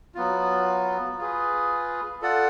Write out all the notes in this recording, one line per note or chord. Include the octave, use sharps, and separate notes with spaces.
F#3 B3 F4
F4 G#4 B4
F4 A4 D5 F#5